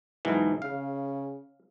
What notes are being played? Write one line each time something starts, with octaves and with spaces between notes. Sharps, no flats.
B1 G#2 E3
C#3 F5